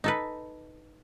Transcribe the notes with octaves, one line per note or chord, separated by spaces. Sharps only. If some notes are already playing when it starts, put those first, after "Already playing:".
D#4 A4 B4